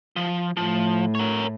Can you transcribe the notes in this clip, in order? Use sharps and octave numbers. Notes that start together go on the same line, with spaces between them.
F3
A2 F3
A#4 C#5